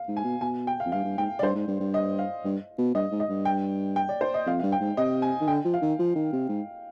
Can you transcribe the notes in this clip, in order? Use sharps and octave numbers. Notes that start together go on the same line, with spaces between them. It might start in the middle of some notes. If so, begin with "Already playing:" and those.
Already playing: F5
G#2
G#5
B2
B2 G#5
G5
F5
F2
G2 F5
G2
G#2 G5
D5
G2 C5
G#2
G2
G2
D#5
F5
G2
B2
G2 D#5
G#2
D#5
G2
G5
G5
D5
C5
D#5
F2 F5
G2 F5
G5
G#2
C3 D#5
G#5
D#3
D3 G5
F3
F5
D#3
F3
D#3
C3
G#2